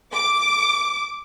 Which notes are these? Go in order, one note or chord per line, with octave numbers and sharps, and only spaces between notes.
D6